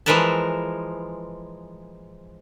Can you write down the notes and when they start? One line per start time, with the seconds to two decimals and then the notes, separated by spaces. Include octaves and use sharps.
0.06 E3 F3 G#3 A#4 B4 A5